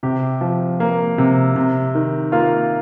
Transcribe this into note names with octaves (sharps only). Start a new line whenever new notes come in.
C3 G4
F3
A#3
C3
C3
D#3
A#3 F4